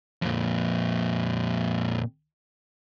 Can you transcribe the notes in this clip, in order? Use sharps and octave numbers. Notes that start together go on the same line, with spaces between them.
F2 A#2